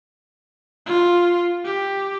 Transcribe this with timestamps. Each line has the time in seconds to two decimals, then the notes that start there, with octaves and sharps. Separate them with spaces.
0.86 F4
1.65 G4